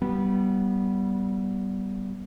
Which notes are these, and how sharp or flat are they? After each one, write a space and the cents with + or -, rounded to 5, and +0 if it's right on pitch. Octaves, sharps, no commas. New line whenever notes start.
G3 -20 B3 -15